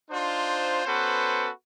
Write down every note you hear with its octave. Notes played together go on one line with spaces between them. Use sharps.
D4 D#4 F4 C5
B3 C#4 F#4 A4 B4 C5